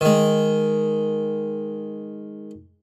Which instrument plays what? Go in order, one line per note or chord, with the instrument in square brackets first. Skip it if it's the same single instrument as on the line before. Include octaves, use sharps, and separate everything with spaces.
[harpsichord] D#3 G#3